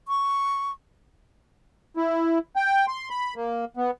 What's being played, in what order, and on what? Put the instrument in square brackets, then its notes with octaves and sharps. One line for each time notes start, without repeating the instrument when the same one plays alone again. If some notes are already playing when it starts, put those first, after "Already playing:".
[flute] C#6
[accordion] E4
G5
C6
B5
A#3
B3